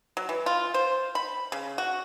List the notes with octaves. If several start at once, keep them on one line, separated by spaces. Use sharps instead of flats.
F#3
E3
F4
C5
B5
C#3
F#4